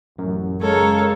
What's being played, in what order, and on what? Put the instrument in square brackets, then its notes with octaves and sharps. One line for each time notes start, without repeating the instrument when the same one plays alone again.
[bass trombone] A1 [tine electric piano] F#2
[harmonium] C#3 A#4 [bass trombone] G#3 [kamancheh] A4 C#5